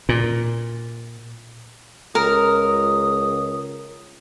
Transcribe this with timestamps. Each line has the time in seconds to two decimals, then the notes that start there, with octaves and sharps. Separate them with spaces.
0.09 A#2
2.15 C#2 A#4 D#6